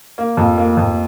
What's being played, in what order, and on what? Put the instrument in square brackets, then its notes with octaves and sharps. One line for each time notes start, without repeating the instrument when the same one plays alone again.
[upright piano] A#3
F2
A#3
F2